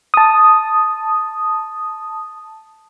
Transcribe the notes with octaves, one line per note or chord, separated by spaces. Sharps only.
A5 D#6